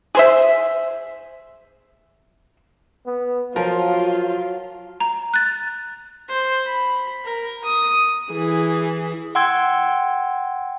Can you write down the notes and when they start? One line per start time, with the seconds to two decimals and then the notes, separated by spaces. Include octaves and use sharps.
0.15 G#4 C5 E5
3.06 B3
3.56 F3 F#3 F4 A#4
5.00 A#5
5.34 F#6 A6
6.29 C5
6.67 B5
7.25 A#4
7.64 D#6
8.32 E3 G#4
9.35 F#5 G5 C6 E6 G#6